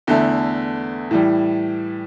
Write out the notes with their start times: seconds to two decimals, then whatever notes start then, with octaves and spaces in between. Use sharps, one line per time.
0.07 E2 D3 A3
1.11 A2 E3 G3